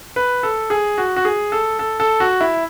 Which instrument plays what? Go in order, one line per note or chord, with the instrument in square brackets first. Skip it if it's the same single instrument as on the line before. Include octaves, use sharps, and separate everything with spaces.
[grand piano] B4
A4
G#4
F#4
F#4
G#4
A4
A4
A4
F#4
E4